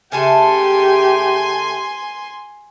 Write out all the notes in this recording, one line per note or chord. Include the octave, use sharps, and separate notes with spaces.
C#3 A3 G4 G#5 A5 C6